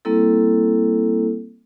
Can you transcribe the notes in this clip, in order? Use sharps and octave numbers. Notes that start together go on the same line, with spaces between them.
G3 A#3 C4 E4 A4